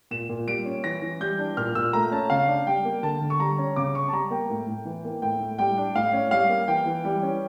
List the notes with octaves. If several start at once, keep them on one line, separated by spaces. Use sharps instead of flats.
A#2 E7
A#2
G3 D7
C#4
E3 A#6
E3
G3 G6
D4
A#2 F6
A#2 E6
A3 A#5
C#4 A5
C#3 F5
D4
G3 G5
A#3
D3 A5
D3
C#6
G3 A#5
C#4
C#3 D6
C#4 C#6
A5
G3 A#5
A#3 G5
A2
A2
E3
A#3
A2 G5
A2
G3 G5
D4
A2 F5
C#4
G3 F5
A#3
E3 G5
E3
G3
C#4